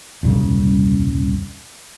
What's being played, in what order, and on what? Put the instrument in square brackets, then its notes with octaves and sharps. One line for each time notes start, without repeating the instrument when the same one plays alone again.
[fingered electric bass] D#1 C2 F#2 C#3